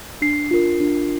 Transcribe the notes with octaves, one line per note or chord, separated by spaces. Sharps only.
D4 C7
F4 A#4
D4